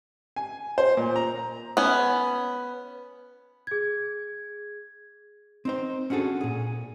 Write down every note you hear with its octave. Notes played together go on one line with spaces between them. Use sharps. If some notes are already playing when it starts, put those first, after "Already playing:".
G#5
C5
A#2
A#5
B3 C#4
G#4 G#6
C4 D#4 C5
C#4 D4 F#4 G#4 A4
A#2 G#4